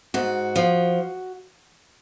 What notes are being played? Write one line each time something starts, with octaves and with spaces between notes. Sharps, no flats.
G#2 F#4
F3